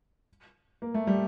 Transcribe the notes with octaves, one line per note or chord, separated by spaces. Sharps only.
A#3
A3
G3